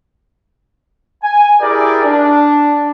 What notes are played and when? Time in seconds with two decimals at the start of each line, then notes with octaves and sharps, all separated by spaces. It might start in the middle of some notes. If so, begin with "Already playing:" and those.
1.23 G#5
1.61 E4 G4 G#4 A#4 D5
2.05 D4